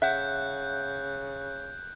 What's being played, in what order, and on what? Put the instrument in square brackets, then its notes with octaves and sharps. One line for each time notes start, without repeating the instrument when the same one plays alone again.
[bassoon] C#3 [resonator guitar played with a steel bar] E5 F#5 [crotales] F#6 G6